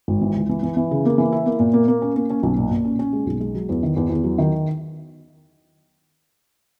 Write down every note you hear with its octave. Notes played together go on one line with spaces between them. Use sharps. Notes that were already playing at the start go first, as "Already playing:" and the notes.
G#1
E3
C#2
E3
E3
E3
C#3
A#3
E3
E4
A#3
A#2
A#3
A#3
C#4
A#3
C#4
B1
A#2
A#2
C#4
C#4
G#3
B1
G#3
F#3
E2
D#3
E2
E2
F#3
D#3